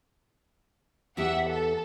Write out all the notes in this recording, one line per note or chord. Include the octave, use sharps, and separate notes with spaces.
E2 B3 G4 E5 F#5
A4